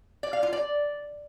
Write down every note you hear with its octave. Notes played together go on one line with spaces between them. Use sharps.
D5
F5
F4
D5